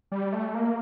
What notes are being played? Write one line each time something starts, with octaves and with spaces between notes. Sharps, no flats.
G3
A3
A#3